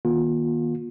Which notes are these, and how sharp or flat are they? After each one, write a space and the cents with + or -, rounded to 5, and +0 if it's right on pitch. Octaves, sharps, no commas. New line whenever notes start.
D#3 +0 A#3 +35 F4 +35